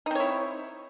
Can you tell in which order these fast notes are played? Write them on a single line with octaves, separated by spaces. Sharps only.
D#4 C4 C#5 E4